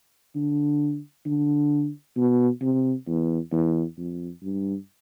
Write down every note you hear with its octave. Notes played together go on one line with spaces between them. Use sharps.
D3
D3
B2
C3
E2
E2
F2
G2